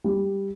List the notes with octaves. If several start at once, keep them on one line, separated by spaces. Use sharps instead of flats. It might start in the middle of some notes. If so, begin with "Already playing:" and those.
G3